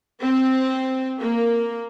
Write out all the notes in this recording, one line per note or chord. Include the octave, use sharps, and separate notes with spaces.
C4
A#3